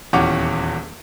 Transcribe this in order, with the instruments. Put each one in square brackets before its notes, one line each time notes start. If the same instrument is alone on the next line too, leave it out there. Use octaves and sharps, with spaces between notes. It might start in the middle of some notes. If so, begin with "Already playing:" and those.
[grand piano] D#1 E2 C#4 G4 F#5 D6